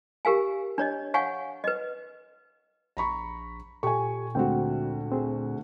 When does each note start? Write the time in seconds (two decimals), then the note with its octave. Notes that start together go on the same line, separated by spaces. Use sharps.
0.25 G4 A#4 F5 G#5
0.78 D4 C#5 D#5
1.14 C#5 F5 F#5 G#5 C#6
1.64 B4 D#5
2.97 A#1 A#5 B5 C#6
3.83 A#2 G4 A4 G#5 C#6
4.35 D2 G#3 C4 F#4 G5
5.11 C4 G#4